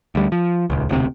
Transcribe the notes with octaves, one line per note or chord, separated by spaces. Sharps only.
D2 G3
F3
D#1 C#2
E1 D2 C3